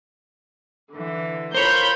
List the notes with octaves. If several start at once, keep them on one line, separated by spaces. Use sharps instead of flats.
D3 E3
F4 A#4 C5 C#5 B5 G6